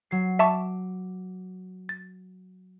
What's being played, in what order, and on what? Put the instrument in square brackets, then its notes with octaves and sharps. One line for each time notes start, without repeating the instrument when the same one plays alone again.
[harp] F#3 C7
[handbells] E5 A5 C#6 [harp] D6
[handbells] A6